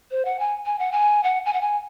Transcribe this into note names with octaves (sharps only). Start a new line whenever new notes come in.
C5
F#5
G#5
G#5
F#5
G#5
F#5
G#5
F#5
G#5